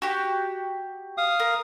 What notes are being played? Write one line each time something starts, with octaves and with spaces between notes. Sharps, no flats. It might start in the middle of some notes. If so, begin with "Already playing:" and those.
F#4 G4
F5 D#6
A#4